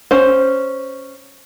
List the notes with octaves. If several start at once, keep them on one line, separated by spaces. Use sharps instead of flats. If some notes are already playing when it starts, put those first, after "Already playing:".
C#4 C5